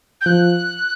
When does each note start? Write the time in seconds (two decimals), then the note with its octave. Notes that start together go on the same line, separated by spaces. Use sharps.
0.21 G6
0.26 F3 F#6